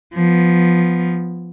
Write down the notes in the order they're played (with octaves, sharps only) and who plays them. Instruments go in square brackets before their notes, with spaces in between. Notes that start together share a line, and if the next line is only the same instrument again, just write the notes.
[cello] F3 B3